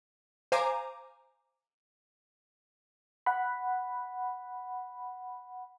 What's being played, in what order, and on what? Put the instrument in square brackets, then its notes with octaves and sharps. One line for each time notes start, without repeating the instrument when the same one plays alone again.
[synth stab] C5 F5 G#5 A#5 D6
[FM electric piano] F#5 B5